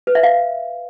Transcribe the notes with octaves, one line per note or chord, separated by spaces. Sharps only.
B4
E5
F5